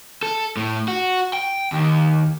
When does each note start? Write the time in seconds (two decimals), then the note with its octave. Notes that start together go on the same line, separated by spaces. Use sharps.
0.23 A4
0.57 A2
0.88 F#4
1.33 G5
1.72 D#2